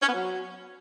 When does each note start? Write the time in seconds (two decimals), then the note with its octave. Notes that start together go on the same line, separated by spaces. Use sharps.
0.02 C#4
0.08 B3
0.14 F#3